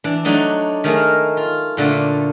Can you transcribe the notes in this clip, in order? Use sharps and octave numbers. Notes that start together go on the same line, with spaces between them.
E3 D4
F#3 A3 D4 D#4
D#3 A3 G#4 A#4
F4
A#2 D3 A3